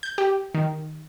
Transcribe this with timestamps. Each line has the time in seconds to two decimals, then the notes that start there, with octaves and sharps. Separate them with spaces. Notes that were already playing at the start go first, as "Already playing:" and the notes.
0.03 G6
0.18 G4
0.55 D#3